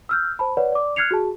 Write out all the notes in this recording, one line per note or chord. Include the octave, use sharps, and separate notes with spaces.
E6 F6 G6
C5 A5 B5
B4 C#5 D5 F#5
D5 D6
F6 F#6 G#6 C7 C#7 F7
F#4 G#4 A5